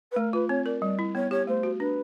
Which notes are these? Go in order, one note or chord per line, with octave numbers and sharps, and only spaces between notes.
B4
A3 A#4
F4 B4
C4 C#5
A#4 D5
G3 D5
E4
B3 C#5
G4 C#5
A3 C5
F#4
D4 B4